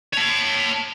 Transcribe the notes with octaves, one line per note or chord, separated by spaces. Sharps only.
C#5 A5